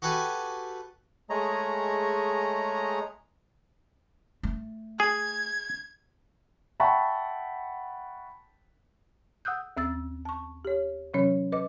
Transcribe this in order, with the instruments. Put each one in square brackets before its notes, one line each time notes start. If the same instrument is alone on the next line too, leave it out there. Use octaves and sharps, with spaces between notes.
[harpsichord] F#4 G4 A4 B4 G#5 C#6
[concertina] G#3 A3 G#4 C#5 D#5 A#5
[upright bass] A3
[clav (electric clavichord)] G#4 [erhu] G#6
[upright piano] E5 F#5 G5 A5 B5 C#6
[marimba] F#5 D#6 E6 F#6 G6
D#2 C4 E6 A6
A5 C#6
G4 C#5
C3 E3 F#3 C#4 C#5
B4 D#5 D6